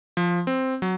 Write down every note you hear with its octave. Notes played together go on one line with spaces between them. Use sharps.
F3
C4
F#3